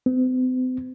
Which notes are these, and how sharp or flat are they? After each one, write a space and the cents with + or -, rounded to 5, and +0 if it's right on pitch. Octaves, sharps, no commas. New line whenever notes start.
C4 -45